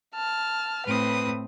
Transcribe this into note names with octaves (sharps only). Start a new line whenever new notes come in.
A5 F6
A2 C4 B4 D#6